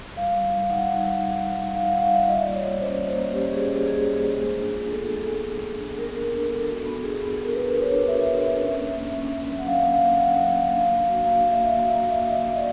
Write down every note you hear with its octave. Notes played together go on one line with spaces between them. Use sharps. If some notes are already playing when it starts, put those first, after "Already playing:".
G3 F5
G3
D#4
D#4 F#5
G3
G3
D#4
G3
D#4
D#4 F5
G3 F#5
F5
G3 E5
F4 D#5
A#3 D5
C#5
F4
C#4 C5
A#3
C5
A#3
C#4 G4
C#4 G#4
G4
F4
A#3 G#4
A#3
A#3
G#3
D4
F4
B3 A4
G#3
A4
G#3
G#3
F4
D4
B3 A#4
B3
A#4
D4
B3 A4
F#4
A4
B3
B3 G#4
B3
A4
B3
A#4
D4 B4
F#4
C#5
D4
F#4 E5
B3
E5
D4
C#4
A#3
A#3
C#4
C#4
F#3
F#5
F#3 F5
A#3
F5
A#3
A#3 F#5
F#3
A#3
D4 F5
A#3
F#4
A#3 F5
A#3
E5
A#3
F#4 F5
A#3
E5
A#3
A#3 D#5
A#3
D5